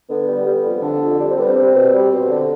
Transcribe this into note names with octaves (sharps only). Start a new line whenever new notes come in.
D3 B3
G3
G3
F2
D3
F2
G3 D4
C4
G3 B3
C4
G3
B2
G3
B2
D3